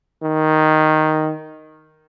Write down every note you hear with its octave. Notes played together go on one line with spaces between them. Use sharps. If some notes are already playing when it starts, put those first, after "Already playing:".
D#3